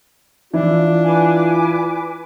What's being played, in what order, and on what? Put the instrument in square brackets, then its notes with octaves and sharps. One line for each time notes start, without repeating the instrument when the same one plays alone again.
[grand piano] E3 E4 [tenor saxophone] D4 [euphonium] F4
[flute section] B4 G#5 D6